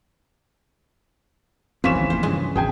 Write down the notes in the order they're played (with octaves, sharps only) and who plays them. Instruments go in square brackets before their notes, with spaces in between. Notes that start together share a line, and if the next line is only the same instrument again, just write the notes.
[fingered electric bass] E1 F#2 C4 [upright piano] E3 B6 E7 [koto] F3 C#4
[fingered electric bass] C2 D#3 G#3
[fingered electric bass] F#1 E2 A#2 [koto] C5
[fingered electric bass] G2 C#3 [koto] G#3
[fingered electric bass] G#1 E2 C#3 [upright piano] G#4 G5 G#5